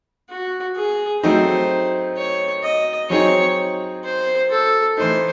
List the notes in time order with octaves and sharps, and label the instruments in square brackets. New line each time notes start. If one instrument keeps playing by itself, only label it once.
[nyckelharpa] F#4
G#4
[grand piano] F#3 A3 C4 D#4 [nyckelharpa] C5
[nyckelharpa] C#5
D#5
[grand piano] F#3 C4 D#4 G#4 [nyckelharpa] C#5
[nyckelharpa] C5
A4
[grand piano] E3 A3 D#4 [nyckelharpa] C5